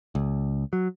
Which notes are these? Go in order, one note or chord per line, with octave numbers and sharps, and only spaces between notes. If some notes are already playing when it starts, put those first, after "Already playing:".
C#2
F#3